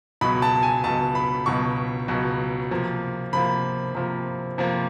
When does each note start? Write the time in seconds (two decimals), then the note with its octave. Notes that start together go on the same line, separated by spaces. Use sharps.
0.21 C#2 B2 F#3 B5
0.42 A5
0.63 G#5
0.84 C#2 B2 F#3 A5
1.15 B5
1.46 C#2 B2 F#3 C#6
2.08 C#2 B2 F#3
2.71 C3 F3 A#3
3.33 C3 F3 A#3 B5
3.95 C3 F3 A#3
4.58 C3 F3 A#3